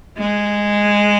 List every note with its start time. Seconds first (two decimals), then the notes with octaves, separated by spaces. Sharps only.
0.18 G#3